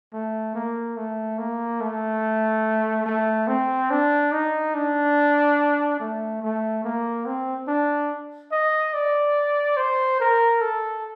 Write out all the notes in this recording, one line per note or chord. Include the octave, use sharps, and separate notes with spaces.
A3
A#3
A3
A#3
A3
A3
C4
D4
D#4
D4
A3
A3
A#3
C4
D4
D#5
D5
C5
A#4
A4